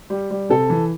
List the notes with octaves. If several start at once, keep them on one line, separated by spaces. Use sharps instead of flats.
G3
G3
C3 A4
E3